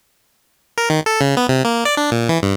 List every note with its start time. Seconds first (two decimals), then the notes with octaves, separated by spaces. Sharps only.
0.78 A#4
0.90 D#3
1.06 A4
1.21 C#3
1.37 B3
1.49 C3
1.65 A#3
1.85 D5
1.97 D4
2.12 A#2
2.29 E3
2.43 G2